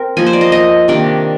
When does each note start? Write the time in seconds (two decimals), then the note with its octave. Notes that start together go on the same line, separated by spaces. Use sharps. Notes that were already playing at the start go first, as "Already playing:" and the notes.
Already playing: C4 A#4
0.17 F3 A#3 D#4 G#5
0.26 C5
0.33 D5
0.41 D#5
0.52 D#5
0.88 C3 D#3 A#3 D4 D5